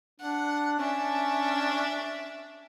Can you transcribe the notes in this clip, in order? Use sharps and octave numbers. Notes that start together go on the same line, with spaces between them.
D4 F#5
C#4 D4 E5